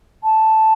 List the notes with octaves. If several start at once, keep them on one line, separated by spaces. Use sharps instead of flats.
A5